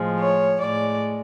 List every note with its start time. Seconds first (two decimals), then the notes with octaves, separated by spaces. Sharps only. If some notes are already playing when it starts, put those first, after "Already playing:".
Already playing: A2 F3 G#3
0.18 C#5
0.60 A2 G#3 D5